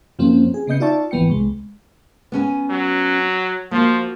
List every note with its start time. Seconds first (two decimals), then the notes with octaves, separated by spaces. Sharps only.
0.19 F#2 F3 A#3 C4 C#4
0.54 G#4
0.67 C#3 B3 D#5 G6 C#7
0.80 D#4 F4 D5 E5 A5 C#6
1.11 G#1 E3 B3 G5 C#7
1.30 C2 G#3
2.32 B3 C#4 G#5
2.70 F#3
3.71 F3 A#3 F#4